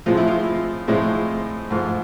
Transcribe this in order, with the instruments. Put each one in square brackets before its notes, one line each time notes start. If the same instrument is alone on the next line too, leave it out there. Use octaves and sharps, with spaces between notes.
[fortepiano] A2 F3 G#3 C4 F4
E4
F4
A2 F3 G#3 C4 E4
G#2 F3 A3